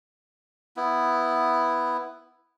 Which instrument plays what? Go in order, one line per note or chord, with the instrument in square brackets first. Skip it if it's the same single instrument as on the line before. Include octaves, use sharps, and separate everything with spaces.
[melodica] B3 E4